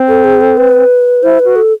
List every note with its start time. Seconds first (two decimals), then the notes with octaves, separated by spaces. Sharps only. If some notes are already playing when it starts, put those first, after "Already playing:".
Already playing: C4
0.08 A4
0.24 G#4
0.41 A4
0.57 B4
1.23 E4 C5
1.39 B4
1.45 F#4
1.56 A4